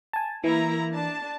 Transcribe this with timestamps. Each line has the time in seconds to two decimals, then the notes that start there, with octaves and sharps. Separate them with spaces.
0.13 G#5 A5
0.44 E3 A#3 E4 A#5
0.92 D4 A5